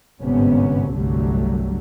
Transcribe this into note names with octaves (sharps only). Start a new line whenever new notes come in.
G1 G#2 C3 B3 C#4
G1 C2 D3 F#3 G3 A3